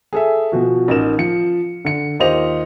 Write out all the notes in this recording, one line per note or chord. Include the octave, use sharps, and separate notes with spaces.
G#4 A4 E5
B2 F3 F#4
A1 D#4 A#4 E7
F3 C#7
D3 C#7
D#2 F4 G4 C5 D#5 F7